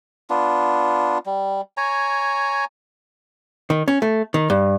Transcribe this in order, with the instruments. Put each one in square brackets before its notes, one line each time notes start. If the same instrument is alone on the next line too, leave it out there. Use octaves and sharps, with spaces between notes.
[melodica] B3 D4 F4
G3
C#5 G#5 A#5
[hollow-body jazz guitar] D#3
C#4
A3
D#3
G2